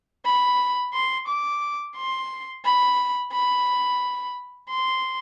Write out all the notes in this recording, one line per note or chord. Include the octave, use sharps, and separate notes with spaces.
B5
C6
D6
C6
B5
B5
C6